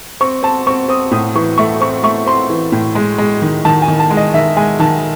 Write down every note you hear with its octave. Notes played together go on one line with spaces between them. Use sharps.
C4 C#6
C4 A5
C4 C#6
C4 D#6
A2 D#6
E3 C#6
A3 C#6
C4 C#6
A3 C#6
C4 C6
E3
A2
G#3
G#3
D#3
D#3 A5
G#5
D#3
A5
G#3
D#5
D#3 E5
G#3 G#5
D#3 A5